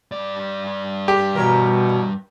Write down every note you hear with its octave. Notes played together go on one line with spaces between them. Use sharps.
G2 D5
G4
B2 E3 A#4 C#5